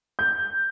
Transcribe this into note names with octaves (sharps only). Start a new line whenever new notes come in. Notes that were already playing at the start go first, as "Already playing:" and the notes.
G6